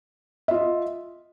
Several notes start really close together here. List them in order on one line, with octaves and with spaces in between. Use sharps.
E5 F4 D#5